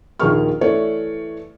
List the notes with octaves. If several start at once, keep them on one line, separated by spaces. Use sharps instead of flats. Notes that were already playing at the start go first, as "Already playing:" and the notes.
A#1 D#2 D#3 G#4 C#6 F6
E3 A3 C#5 D5